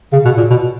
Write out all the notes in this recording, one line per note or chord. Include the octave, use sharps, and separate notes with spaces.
C#3
B2
A#2
B2